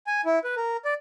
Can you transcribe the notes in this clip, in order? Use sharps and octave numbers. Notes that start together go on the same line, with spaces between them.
G#5
E4
B4
A#4
D5